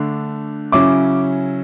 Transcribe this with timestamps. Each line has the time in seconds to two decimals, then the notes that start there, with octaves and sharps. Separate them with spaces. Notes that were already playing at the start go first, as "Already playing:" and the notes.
Already playing: D3 A3 D4
0.72 C#3 F#3 C#4 E4 D6